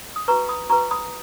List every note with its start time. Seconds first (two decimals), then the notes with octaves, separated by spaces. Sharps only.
0.16 D#6
0.28 F#4 B4 A#5 C#6
0.49 B5 D#6
0.70 F#4 B4 A#5 C#6
0.91 B5 D#6